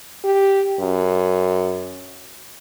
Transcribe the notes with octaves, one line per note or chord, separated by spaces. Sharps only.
G4
F#2